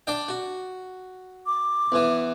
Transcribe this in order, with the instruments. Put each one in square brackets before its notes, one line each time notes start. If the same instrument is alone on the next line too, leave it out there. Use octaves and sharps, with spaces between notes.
[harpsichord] D4 D5 G5
F#4
[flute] D6
[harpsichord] E2 E3